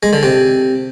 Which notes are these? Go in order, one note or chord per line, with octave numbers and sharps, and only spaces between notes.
G#3
D3
C3